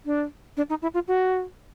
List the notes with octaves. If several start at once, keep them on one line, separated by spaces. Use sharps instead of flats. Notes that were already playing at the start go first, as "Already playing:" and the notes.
D4
D4
D#4
E4
F4
F#4